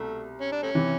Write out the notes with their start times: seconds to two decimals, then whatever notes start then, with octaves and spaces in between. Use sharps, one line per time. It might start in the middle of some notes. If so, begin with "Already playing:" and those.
Already playing: C2 B2 A3
0.41 C#4
0.52 D4
0.63 A3 C#4
0.75 C3 E3